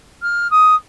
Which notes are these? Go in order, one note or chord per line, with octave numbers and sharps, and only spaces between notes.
F6
D#6